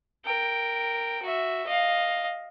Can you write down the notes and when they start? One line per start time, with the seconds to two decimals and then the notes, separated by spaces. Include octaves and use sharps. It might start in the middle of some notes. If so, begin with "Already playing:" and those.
0.24 A#4 G5
1.22 F#4 E5
1.66 D#5 F5